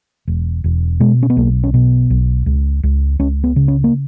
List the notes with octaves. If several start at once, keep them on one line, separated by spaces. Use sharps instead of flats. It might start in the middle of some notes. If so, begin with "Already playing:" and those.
E1
E1
B2 G#3
C#4
B3
B1 A#3
C#4
B2 B3
B1
C#2
C#2
C#2 C#4
B3
C#3
C#4
A#3